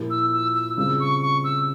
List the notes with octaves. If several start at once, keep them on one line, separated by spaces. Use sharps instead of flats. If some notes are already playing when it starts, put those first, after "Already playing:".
Already playing: A#2 F3 A#3 E4 G4
E6
E6
E6
C#3 G3 C4 F4 E6
C#6
C#6
E6